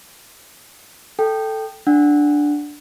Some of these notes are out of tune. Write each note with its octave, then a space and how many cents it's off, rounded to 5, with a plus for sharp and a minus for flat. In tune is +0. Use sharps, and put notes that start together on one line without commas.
A4 +0 G5 +0
D4 +0 F#5 +0